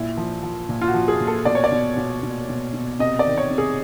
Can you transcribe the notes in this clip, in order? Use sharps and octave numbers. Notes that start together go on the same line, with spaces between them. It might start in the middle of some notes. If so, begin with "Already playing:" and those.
Already playing: A#2 E4
F3
F3
A#2
F4
F#4
F3
G#4
A#2
A4
B2 D5
C#5
D5
B2
B2
B2
B2
B2
C3 D#5
D5
D#3
C#5
C3
G#4